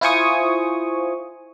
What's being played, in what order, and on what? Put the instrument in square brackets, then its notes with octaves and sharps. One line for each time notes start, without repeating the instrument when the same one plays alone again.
[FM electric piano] E4 F4 C5 G#5 C#6 D#6